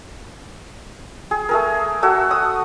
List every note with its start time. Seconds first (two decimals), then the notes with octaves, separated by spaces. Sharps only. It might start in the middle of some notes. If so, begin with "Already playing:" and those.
1.31 G#4
1.49 A3 G#4 A#4
2.02 F#4 A4 E5
2.31 D#6